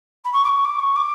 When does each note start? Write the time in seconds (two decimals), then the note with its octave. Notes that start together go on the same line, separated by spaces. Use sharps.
0.24 B5
0.33 C#6
0.44 D6
0.49 C#6
0.64 D6
0.80 C#6
0.96 D6